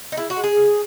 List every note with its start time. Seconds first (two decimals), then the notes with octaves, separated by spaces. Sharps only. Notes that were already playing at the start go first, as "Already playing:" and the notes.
0.12 D#4
0.17 C#3 E4
0.30 F#4
0.36 G#3
0.44 G#4
0.56 C#3